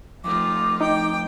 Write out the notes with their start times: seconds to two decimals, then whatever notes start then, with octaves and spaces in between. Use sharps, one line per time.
0.24 F2 A3 D#4 F4 D6
0.81 D#4 G5